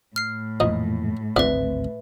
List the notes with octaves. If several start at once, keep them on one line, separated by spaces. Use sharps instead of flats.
A2 F6 C7
F2 A#2 E3 F3 D#4 D#5
G#1 D2 G#2 F3 C4 B4 D5 E5